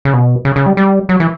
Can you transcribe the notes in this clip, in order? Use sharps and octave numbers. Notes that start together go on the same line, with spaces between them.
C#3
B2
C#3
C#3
G3
G3
F#3
E3